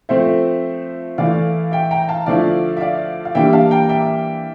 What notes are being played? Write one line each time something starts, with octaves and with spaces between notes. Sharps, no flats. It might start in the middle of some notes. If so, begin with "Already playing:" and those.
F3 A3 C4 C5 E5
E3 A3 E4 D5 F5
E5 G5
G5 A#5
F5 A5
D3 F3 A3 E4 D5 F5
E5
D5 F5
F5
E3 G3 A#3 D4 E5 G5
F5 A5
G5 A#5
E5 G5